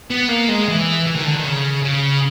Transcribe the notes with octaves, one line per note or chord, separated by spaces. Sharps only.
B3
A#3
G#3
E3
E3
D#3
D3
D#3
C#3
C#3